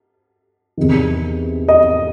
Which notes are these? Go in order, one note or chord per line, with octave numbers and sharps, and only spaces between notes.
E2 C3 D#3
D#5